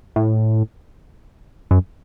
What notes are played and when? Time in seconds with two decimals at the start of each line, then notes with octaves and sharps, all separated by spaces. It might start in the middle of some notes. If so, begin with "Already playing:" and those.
0.16 A2
1.71 F#2